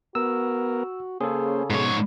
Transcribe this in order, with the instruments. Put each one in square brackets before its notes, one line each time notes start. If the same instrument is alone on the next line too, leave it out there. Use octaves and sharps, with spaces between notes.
[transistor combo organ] B3 A#4 [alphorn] F#4 [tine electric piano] E6
[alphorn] C#3 [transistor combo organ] A#3 C#4 C5 [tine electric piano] G#4 A4
[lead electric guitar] G#2 C#5 [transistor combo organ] B2